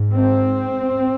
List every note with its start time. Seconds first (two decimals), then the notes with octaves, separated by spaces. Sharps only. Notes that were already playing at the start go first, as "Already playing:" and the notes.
Already playing: G#2
0.13 C4